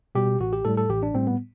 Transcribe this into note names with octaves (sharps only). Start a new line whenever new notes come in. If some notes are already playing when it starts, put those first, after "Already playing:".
B2 G3 G4
A1 F#4
G4
A2 G3 A4
A4
A1 G4
D4
A2 G3 C4
B3